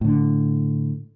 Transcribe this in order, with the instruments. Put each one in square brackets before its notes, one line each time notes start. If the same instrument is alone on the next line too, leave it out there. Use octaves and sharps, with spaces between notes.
[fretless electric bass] A2 D3